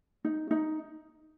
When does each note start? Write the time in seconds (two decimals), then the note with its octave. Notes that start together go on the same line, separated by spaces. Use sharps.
0.25 D#4
0.51 D#4